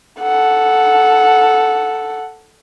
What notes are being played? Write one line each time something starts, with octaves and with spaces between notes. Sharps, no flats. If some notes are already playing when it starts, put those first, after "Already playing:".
A4 F#5